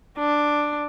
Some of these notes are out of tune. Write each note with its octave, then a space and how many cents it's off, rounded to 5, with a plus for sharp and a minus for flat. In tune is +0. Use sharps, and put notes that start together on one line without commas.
D4 +5